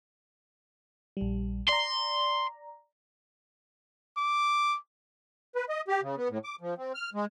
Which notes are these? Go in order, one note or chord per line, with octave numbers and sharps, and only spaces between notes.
A#1 G3
D5 A#5 C6
D6
B4
D#5
G4
C#3
B3
A2
D6
F3
C4
F6
G#3